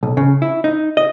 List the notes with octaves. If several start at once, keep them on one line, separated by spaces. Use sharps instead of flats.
B1
C#3
E4
D#4
D#5